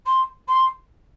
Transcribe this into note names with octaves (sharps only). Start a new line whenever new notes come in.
C6
C6